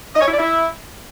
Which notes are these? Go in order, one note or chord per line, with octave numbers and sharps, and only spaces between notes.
D#5
C#5
E4
D5
E4